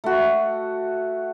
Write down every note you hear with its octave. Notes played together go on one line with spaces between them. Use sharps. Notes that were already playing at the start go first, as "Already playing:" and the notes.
A3 F#4